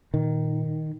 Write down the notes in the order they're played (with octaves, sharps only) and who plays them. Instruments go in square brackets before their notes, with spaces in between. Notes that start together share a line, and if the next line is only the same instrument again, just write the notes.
[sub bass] A#2 [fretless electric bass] D#3